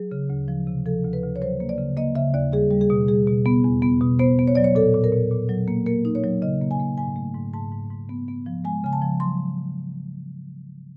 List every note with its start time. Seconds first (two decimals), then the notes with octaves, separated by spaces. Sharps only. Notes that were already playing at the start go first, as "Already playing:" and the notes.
Already playing: F#3 G#4
0.12 C#3
0.30 D2
0.48 F3
0.67 C3
0.86 F3 A4
1.04 D2
1.13 B4
1.23 D2
1.36 C#5
1.42 F#3 C5
1.60 A#3
1.69 D5
1.78 C#3
1.97 A#3 D#5
2.15 C#3 E5
2.34 D#2 D5
2.52 G3 G#4
2.71 G3
2.81 G#4
2.90 B2
3.08 G3 G#4
3.27 B2
3.46 B3
3.64 E2
3.82 B3
4.01 B2
4.19 B3 C5
4.39 B3
4.47 C#5
4.55 F#3 D5
4.64 C#5
4.75 A#2 A4
4.94 A#2
5.04 A#4
5.12 A#2
5.31 A#2
5.49 F#3
5.68 A#3
5.86 A#3 A#4
6.05 D#4
6.15 C#5
6.24 F#3
6.42 C#3 D#5
6.61 A#3
6.71 G#5
6.80 A#3
6.98 G#2 G#5
7.16 A3
7.35 G#2
7.53 G#2 A5
7.72 G#2
7.91 G#2
8.09 B3
8.28 B3
8.46 F3
8.65 G#3 G#5
8.84 C#3 G#5
8.93 A5
9.02 F3
9.20 F#3 C6